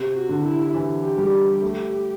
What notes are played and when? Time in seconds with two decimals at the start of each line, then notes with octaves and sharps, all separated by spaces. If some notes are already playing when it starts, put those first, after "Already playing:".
Already playing: C3
0.14 F#4
0.29 D3
0.44 E4
0.74 E3
1.03 G4
1.18 G3
1.33 G4
1.62 A3